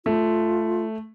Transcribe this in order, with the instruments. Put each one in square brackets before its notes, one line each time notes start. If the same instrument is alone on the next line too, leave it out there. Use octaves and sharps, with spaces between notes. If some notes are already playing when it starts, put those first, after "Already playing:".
[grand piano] A3 [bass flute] F4